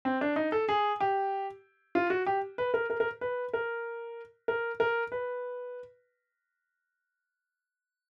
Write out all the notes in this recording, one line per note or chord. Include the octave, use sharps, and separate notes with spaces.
C4
D4
D#4
A4
G#4
G4
F4
F#4
G4
B4
A#4
A#4
A#4
B4
A#4
A#4
A#4
B4